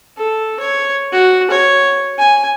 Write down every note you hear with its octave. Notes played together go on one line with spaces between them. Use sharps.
A4
C#5
F#4
C#5
G#5